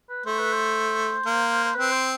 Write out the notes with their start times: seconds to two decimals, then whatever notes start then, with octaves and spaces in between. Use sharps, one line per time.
0.09 B4
0.25 A3 C5
0.39 B4
0.53 C5
1.26 A#3
1.64 C5
1.75 C4 B4
1.91 C5